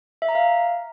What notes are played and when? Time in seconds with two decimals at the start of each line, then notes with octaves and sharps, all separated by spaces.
0.22 E5
0.29 A#5
0.35 F5